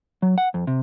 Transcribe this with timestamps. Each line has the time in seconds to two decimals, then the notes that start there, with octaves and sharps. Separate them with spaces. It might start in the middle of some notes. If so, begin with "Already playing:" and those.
0.22 F#3
0.38 F#5
0.54 F2
0.67 C3